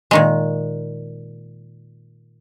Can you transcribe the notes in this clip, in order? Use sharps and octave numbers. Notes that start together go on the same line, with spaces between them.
A#2 D#3 G#3